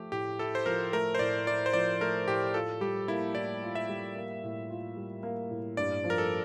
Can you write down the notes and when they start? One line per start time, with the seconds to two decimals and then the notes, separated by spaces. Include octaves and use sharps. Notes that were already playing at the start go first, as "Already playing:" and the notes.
Already playing: F3 A3 G4
0.12 A2 G4
0.39 E4 A4
0.55 C5
0.66 F3 A#4
0.93 A3 A#4
1.15 C5
1.19 A2 D5
1.47 E4 D5
1.66 C5
1.73 F3 D5
2.00 A3 A#4
2.28 A2 G4
2.54 F4 A4
2.81 G3 G4
3.08 A#3 E4
3.35 A2 D5
3.63 F4
3.75 E5
3.89 G3
4.16 A#3
4.43 A2
4.70 F4
4.97 G3
5.23 A#3
5.51 A2
5.77 G2 D5
6.04 F3
6.10 A#4
6.18 A4